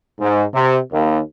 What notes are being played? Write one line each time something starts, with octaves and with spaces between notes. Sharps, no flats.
G#2
C3
D#2